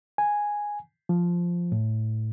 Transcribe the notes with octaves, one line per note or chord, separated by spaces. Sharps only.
G#5
F3
A2